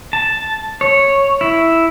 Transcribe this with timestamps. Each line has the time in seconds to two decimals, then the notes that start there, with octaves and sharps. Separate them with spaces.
0.13 A5
0.81 C#5
1.41 E4